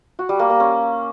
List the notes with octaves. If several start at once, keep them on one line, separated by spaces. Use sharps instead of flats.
F#4
G3
A#3
A#3
C#4